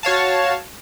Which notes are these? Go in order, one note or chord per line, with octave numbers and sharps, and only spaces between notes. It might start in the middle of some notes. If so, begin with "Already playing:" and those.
F#4 C#5 F5 A5